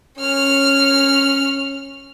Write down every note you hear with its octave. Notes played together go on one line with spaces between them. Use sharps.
C#4 F6